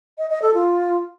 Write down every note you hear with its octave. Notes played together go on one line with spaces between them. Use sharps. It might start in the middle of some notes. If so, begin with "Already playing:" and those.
D#5
D#5
A4
F4